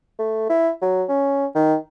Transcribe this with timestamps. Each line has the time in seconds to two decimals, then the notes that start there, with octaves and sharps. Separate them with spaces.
0.19 A3
0.49 E4
0.82 F#3
1.09 C#4
1.55 D#3